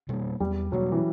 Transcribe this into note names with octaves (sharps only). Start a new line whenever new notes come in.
B2 G3 A#3
E2 G3
B2 F#3 G3 A#3
E3